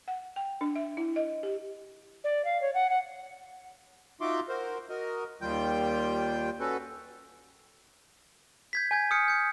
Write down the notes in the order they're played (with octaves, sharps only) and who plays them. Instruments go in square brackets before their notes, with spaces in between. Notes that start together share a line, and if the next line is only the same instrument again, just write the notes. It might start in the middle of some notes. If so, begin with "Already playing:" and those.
[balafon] F#5
G5
D4
E5
E4
D#5
G4
[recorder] D5
F5
C#5
F#5
F#5
[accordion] D#4 F4 F#4 E5 C6 D6
F#4 A#4 C5
F#4 A#4 D#5
D#2 D#3 G3 F4 G5 G6
C#4 F#4 A4 B4
[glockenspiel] G6 G#6 B6
G#5 G6 G#6
D#6 F6 G6 C#7
G6 C#7